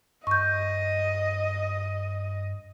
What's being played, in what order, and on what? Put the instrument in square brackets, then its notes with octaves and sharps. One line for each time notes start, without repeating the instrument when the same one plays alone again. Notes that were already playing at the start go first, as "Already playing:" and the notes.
[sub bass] G2 [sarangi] D#5 [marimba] C#6 G6